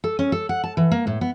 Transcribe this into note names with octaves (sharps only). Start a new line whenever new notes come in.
A4
C#4
A4
F#5
A5
E3
A#3
A2
B3